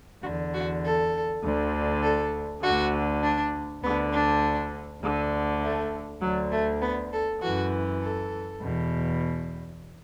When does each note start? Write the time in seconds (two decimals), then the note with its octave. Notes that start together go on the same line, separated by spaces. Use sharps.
0.23 D3 F#4
0.28 E2
0.54 F#4
0.84 A4
1.43 D2 D3
2.03 A4
2.63 D2 D3 F#4
3.23 D4
3.83 D2 D3 B3
4.12 D4
5.02 D2 D3
5.63 A3
6.22 D2 D3 F#3
6.52 A3
6.82 B3
7.12 A4
7.41 F#2 E3 F#4
8.02 A4
8.61 E2 B2